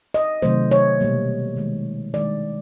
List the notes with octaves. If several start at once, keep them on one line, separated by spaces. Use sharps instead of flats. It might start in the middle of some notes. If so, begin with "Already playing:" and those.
D#5
C3 D#3 F#3 A3 C5
C#5
B2 G3 A#3
D#3 G#3
D#3 G#3 D5